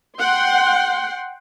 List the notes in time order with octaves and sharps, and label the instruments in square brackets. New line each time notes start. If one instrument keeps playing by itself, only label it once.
[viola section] F#5 G5 C6